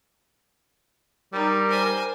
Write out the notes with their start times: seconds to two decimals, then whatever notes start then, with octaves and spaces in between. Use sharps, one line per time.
1.33 G3 D#4 A#4
1.71 C5 G#5